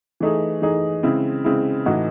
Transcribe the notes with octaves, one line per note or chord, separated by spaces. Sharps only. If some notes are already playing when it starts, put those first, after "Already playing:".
E3 A3 D#4 G#4
E3 A3 D#4 G#4
C#3 G#3 C4 E4
C#3 G#3 C4 E4
A2 E3 A3 D#4 F#4